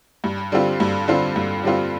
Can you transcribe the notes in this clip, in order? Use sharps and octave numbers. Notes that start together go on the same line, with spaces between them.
G2
D3 G3 C4 F4
G2
D3 G3 C4 F4
G2
D3 G3 C4 F4